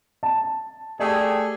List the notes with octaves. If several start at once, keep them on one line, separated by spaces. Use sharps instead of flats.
A5
A3 G4 G#4 D5